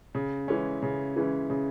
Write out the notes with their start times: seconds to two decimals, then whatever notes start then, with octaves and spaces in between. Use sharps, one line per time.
0.15 C#3
0.48 E3 G#3 C#4
0.82 C#3
1.16 E3 G#3 C#4
1.50 C#3